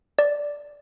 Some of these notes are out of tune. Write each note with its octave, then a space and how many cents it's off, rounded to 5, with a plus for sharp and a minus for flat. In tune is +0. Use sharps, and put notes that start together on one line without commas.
D5 -5